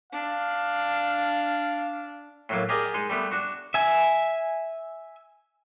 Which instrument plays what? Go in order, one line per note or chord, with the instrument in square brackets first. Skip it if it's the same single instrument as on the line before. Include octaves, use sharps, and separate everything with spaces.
[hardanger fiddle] D4 [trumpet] F5
[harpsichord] A2 F#3 A#3
G4 G#4 A#4 D5 D#5
G#3 D#4
G3 A3 B3
D4 F#4
[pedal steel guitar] E5 G#5